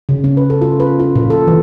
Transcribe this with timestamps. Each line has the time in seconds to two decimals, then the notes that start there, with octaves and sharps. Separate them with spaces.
0.09 C#3
0.24 C#4
0.37 B4
0.50 A4
0.61 F4
0.80 B4
1.00 F4
1.15 A#2
1.30 A4
1.47 E3